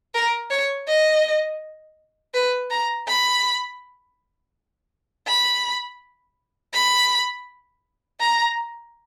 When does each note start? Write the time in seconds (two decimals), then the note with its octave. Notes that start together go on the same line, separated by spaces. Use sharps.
0.14 A#4
0.50 C#5
0.88 D#5
2.34 B4
2.71 A#5
3.07 B5
5.27 B5
6.73 B5
8.20 A#5